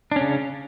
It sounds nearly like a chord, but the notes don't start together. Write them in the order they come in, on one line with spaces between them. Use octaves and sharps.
D4 C#4 C#3